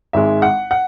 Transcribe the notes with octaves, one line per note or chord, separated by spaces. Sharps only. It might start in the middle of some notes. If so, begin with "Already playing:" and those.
G#1 G#2 G#3 E5
F#5
F#5